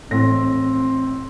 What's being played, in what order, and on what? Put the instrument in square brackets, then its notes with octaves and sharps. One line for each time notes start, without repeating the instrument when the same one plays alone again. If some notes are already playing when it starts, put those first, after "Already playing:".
[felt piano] A1 A2 A#6 [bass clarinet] C4